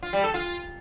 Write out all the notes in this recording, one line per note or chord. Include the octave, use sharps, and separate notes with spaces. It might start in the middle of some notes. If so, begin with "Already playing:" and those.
F4
G3
A4
F4